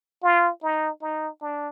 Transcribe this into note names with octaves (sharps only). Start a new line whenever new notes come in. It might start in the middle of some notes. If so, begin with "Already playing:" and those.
F4
D#4
D#4
D4